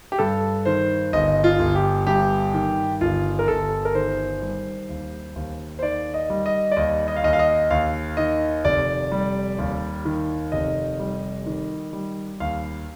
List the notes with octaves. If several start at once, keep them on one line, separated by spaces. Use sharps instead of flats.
G4
G2 A4
D#3 C5
G1 D#5
F4
G1
G4
G2 G4
D#3
G1 F4
A#4
G1 A4
A#4
D#3 C5
G3
D#2
D#2
C5
D#3 D5
D#5
G3
D#5
D5
D#2 D#5
D#5
F5
D#2 D#5
F5
D#5
D#2 F5
D#3 D#5
F1 D5
G3
D#2
D#3
F1 D#5
G3
D#3
G3
D#2 F5